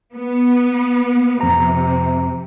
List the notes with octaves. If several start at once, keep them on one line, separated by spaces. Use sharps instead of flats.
B3
F2 C3 A#5